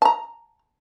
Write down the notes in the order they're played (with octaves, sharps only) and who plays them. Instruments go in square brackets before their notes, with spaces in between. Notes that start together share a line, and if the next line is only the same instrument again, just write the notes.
[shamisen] A5 A#5